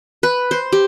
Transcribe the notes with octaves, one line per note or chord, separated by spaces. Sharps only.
B4
C5
G4